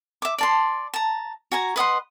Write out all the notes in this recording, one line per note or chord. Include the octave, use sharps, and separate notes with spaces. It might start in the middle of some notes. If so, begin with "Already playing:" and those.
E5 D6
D5 A5 C6
A5 A#5
F#4 G#5 A#5
B4 D#5 F#5 C6